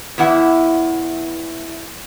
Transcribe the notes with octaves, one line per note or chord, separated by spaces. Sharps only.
E2 E3 E4 F#5